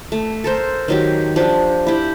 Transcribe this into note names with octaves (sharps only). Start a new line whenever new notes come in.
A3
A4 A#4 C5
D#3 F#3 G4
F3 D4 G4
E4 G4